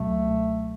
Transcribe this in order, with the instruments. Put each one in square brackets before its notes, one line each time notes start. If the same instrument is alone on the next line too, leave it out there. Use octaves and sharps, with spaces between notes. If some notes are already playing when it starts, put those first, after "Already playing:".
Already playing: [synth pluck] C#2 B2 F#3 [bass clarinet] A3